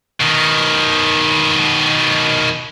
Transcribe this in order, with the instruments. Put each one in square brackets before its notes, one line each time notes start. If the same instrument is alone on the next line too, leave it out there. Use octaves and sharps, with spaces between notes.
[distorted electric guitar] B2 D#3